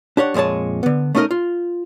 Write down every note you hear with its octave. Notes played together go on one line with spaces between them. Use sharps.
D4 G4 C#5 F#5
F2 A#2 G#3 C#5 A5
D3 B3
A3 C#4 D#4 F#4 A#4 D#5
F4